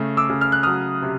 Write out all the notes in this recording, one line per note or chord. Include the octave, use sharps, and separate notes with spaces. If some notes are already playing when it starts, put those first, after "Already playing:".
Already playing: C#3 A3
D6 E6
C#3
F6
F#6
F#3 D#6 F6
C3